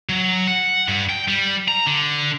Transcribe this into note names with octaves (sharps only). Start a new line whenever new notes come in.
F#3
F#5
G2
G5
G3
A#5
D3